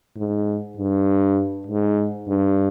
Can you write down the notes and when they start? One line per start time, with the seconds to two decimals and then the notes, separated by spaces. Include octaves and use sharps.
0.16 G#2
0.77 G2
1.67 G#2
2.28 G2